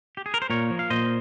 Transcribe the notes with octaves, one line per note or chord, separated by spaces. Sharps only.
G4
G#4
A#4
C5
A#2 A#4 C#5
F3
F5
A#2 C5 D#5